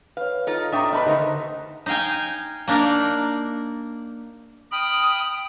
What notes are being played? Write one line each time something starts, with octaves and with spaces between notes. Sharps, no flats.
B4 C#5 F5
D#4 F4 A4
D4 E5 G5 A#5 C#6 D#6
A3 A#4 B4 D#5 A5 B5
D3 D#4 A#4 C5
D#4 D#5 F5 G5 G#5
A#3 D4 D#4 A#4 D5
G5 B5 D#6 F6